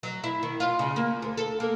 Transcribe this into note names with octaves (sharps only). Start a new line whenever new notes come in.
F#3
E4
D#3
F4
C#3
A#3
D2
A4
A#3